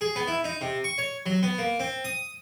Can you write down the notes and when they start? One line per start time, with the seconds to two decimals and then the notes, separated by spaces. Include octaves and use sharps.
0.01 G#4
0.16 B3
0.28 E4
0.44 D#4
0.61 C3
0.84 C#6
0.98 C#5
1.26 F#3
1.43 B3
1.58 A#3
1.80 C4
2.04 D#6